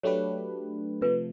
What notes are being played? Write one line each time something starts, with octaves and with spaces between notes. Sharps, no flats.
F#3 A3 D4 G4 B4 C#5
C3 F3 A3 B4